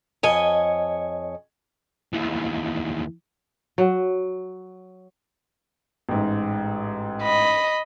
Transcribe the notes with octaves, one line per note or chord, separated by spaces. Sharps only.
F2 C#5 D#5 G#5
D#2 E3
F#3
A1 G#2
D#5 B5